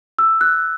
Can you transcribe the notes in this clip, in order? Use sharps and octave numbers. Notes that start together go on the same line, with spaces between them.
E6
F#6